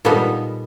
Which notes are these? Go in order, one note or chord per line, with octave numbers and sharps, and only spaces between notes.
A#2 G3 B3 D#4 A4